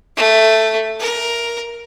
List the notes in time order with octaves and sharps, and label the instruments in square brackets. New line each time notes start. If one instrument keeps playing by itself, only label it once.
[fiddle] A3
A#4